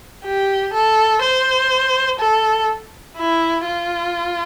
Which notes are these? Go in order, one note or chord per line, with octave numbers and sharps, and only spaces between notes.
G4
A4
C5
A4
E4
F4